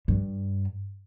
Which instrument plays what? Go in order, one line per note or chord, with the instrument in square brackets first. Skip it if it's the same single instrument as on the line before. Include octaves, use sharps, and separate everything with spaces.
[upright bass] G2